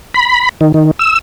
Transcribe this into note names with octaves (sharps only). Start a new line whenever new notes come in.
B5
D#3
D#3
E6